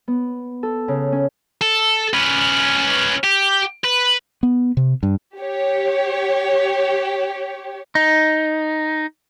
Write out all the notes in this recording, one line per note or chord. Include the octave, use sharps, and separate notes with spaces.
B3
A4
C#3
C#4
A4
C#4 B4
G4
B4
B3
C3
G2
G4 C#5
D#4